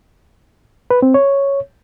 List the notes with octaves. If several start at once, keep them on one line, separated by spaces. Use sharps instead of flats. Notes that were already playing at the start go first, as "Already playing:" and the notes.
B4
C4
C#5